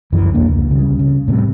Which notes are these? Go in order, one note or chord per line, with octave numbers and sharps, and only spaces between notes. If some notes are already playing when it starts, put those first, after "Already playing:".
C2 F#2 E3
B1 E2 A#3 D4
C#2
C#3 G3
C#3
A2 C3 E3 G3